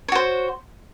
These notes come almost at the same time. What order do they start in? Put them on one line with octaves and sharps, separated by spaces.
C#5 F#4 C5